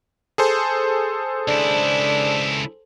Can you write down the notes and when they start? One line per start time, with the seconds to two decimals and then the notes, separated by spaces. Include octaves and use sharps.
0.38 G#4 A4 C5
1.48 C#2 D4 E4